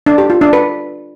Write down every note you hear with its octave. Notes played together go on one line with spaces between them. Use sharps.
D4
G4
F4
D4
B4